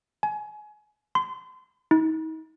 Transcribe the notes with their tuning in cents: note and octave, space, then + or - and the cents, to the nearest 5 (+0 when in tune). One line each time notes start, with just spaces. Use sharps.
G#5 +25
C6 -35
D#4 +40